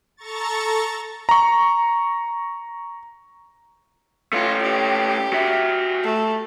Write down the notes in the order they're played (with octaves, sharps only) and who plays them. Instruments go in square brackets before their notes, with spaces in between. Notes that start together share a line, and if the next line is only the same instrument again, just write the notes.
[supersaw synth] A4 A#5 C#6 A6
[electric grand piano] A#5 C#6
[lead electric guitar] A3 C#4 [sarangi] F4
[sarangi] G4
[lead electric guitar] F#4 E5
[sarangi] A3